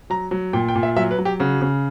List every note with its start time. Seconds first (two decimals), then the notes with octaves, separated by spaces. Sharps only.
0.10 F#3 A#5
0.31 F#3
0.53 A#2 G5
0.68 G5
0.75 A#2
0.83 E5
0.96 F#3 E5
1.11 B4
1.18 F#3
1.25 G4
1.40 C#3 F#4
1.62 C#3